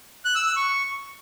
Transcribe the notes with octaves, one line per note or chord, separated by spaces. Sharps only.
F#6
E6
E6
C#6